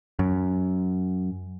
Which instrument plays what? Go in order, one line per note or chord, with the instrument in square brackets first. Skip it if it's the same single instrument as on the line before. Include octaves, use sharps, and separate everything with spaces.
[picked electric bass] F#2